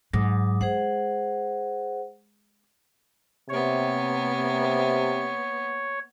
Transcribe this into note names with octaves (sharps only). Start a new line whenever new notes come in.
G#2 F#3 D6 D#6
G#3 G#4 C5 F#5
C3 A#3 B3 C#5